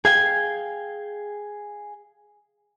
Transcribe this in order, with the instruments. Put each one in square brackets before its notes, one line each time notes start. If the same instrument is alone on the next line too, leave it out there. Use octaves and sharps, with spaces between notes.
[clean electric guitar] G#4 F5 G5 [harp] G#6